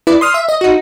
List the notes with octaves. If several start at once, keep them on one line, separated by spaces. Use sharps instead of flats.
E4 B4 D5
C6 D#6 F6
E5
D#5
D#4 F#4